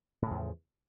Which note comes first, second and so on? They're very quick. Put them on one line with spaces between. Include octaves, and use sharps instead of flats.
A2 C#3 E2 F3